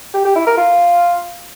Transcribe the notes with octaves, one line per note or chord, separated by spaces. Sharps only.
G4
G4
E4
A#4
F4